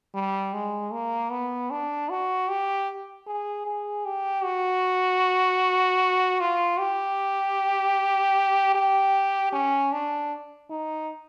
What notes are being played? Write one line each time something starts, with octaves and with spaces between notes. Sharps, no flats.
G3
G#3
A#3
B3
D4
F#4
G4
G#4
G#4
G4
F#4
F4
G4
G4
C#4
D4
D#4